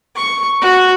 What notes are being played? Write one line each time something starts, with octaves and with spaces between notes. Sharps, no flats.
C#6
F#4